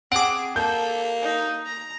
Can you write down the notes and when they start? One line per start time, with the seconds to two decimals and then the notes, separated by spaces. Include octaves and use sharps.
0.12 C4 G#4 F#5 D6 D7
0.56 A#3 A4 G6
1.22 D#4
1.65 A#5